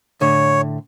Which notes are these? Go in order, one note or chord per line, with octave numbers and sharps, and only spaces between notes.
A2 D3 C#5